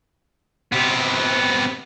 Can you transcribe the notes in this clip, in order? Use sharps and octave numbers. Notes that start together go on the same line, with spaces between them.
C3 B3